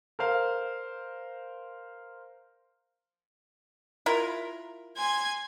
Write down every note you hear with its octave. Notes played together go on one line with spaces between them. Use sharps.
A#4 C5 F5
E4 F4 A#4
G#5 C6 G#6